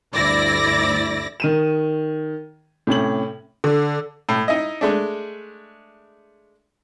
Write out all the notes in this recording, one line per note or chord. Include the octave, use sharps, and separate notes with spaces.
D2 G2 E4 D5 A#6
D#3 D#7 E7
A2 C3 C#4 F#7
D3
A2
D#4 E4 D#5
G#3 A3 D4